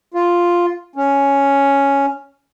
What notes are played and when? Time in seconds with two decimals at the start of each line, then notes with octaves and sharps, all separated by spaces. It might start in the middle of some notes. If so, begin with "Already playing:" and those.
0.14 F4
0.96 C#4